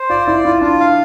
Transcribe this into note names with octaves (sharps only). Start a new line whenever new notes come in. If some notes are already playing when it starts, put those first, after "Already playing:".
Already playing: C5
F4 D5
E4 D5
E4 F4
D4 F4
F5